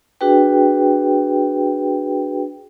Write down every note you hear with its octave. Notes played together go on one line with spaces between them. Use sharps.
D4 F#4 G#4 B4 G5